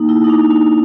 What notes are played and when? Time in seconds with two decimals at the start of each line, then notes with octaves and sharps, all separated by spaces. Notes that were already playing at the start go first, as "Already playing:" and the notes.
Already playing: A#3 D#4
0.09 E4
0.24 D#4
0.30 D4
0.50 D4